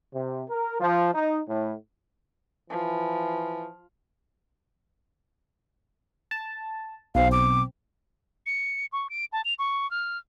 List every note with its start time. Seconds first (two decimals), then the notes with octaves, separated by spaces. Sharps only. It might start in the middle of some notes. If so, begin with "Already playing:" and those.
0.14 C3
0.49 A#4
0.80 F3
1.14 D#4
1.49 A2
2.70 E3 F3
6.31 A5
7.15 B1 C4 F5
7.32 D6
8.46 C#7
8.92 C#6
9.10 D7
9.33 A5
9.45 F7
9.59 C#6
9.91 F6